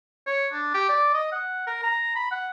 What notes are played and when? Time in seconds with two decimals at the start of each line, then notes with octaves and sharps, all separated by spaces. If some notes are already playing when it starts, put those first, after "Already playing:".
0.27 C#5
0.52 D4
0.74 G4
0.89 D5
1.14 D#5
1.32 F#5
1.67 A#4
1.83 A#5
2.16 B5
2.31 F#5